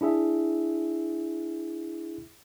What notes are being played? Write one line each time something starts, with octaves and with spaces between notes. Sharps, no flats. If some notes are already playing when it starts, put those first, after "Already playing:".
D4 E4 G#4 E5